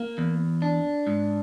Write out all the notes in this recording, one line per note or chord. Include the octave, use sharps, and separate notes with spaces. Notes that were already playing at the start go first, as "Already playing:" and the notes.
Already playing: A#3
E2
D4
G#2